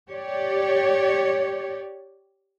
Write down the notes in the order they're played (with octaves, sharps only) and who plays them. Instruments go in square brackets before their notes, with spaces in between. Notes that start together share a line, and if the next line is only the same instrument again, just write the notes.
[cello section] G4 C#5 D5